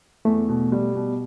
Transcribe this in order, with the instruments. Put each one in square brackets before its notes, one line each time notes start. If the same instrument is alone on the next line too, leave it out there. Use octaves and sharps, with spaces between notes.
[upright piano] E2 [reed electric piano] A3
[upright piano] B2
G3
B2